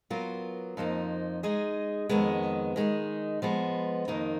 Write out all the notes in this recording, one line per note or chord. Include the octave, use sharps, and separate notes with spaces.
F#3 B3 F4 A#4
F2 F3 A#3 D#4
G#3 D#4 G#4 D#5
F2 D#3 G#3 B3
D#3 G#3 D#4
F3 G#3 B3
F2 D#3 A#3 D#4